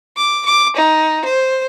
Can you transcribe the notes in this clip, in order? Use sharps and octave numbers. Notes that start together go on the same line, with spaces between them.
D6
D6
D#4
C5